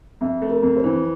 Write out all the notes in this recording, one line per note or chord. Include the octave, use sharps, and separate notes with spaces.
F2 E5
A3
A#4
F2
C5
E3